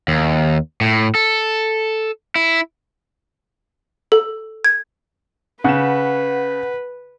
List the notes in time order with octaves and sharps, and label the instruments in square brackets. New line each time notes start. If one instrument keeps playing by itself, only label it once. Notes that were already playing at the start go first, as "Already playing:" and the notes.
[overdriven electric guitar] D#2
A2
A4
E4
[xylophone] A4
G#6
[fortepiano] C#3 [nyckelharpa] B4 [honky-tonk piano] F#5 E7